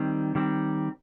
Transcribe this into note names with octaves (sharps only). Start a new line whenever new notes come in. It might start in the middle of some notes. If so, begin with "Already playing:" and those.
Already playing: D#3 G3 C4
D#3 G3 C4